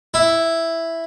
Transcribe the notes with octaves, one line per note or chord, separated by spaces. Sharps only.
E4